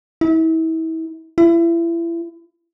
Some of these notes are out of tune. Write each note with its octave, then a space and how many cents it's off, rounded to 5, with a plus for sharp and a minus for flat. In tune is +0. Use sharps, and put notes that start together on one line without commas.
E4 -35
E4 +30